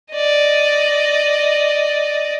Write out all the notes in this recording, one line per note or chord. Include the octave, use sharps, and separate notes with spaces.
D5 D#5